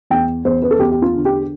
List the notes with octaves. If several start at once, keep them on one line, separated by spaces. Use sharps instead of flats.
E2 G5
E2 C5
B4
A4
E2 G4
G4
F4
D3
G4